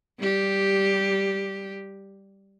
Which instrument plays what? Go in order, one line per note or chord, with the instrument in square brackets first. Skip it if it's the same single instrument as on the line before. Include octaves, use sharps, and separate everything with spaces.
[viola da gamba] G3 G4